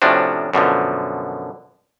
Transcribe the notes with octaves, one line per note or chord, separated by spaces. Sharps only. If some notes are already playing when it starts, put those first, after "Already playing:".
A2 C3 F3 C#4 D4 F#4
F#2 B2 D3 F3